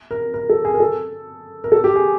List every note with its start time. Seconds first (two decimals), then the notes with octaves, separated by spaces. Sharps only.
0.11 A#4
0.34 A#4
0.50 A4
0.65 G#4
0.74 A#4
0.80 A4
1.64 A#4
1.72 A4
1.84 G4
1.96 G#4